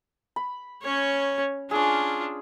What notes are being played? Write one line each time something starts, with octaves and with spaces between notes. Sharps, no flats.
B5
C#4 C#5
C#4 D4 F4 G#4